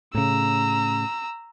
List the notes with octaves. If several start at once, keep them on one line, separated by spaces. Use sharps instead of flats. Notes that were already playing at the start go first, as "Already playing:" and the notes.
A2 C#3 A#5 E6